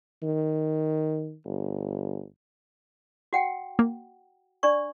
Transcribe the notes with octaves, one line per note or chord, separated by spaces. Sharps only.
D#3
G1
F#4 F#5 G5
A#3
D4 D5 C#6